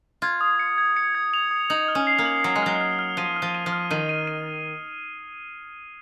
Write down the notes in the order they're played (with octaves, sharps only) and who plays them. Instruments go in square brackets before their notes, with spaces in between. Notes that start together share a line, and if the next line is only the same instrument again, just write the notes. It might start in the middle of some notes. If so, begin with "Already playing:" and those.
[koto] F4 [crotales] G#6
[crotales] D#6
C#7
G#6
C#7
G#6
F7
D#6
[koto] D#4 [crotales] F#7
[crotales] F6
[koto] C#4
[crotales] C7
[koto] A#3
[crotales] F#7
[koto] F#3 [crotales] C7
[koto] G#3
[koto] F#3 [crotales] F6
[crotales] F6
F6
[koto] F3 [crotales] D#7
[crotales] F6
[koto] F3
[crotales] D#7
[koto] F3
[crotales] F6
[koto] D#3 [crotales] D#7
[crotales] D#7
D#7